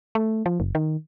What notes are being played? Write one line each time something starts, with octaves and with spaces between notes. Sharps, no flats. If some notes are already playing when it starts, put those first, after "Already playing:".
A3
F3
F#1
D#3